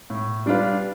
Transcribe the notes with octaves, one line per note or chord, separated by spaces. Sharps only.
A2
G3 D4 F4 B4